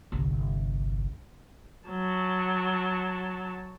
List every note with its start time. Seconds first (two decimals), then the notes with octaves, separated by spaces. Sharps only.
0.12 G1 C2
1.89 F#3 A5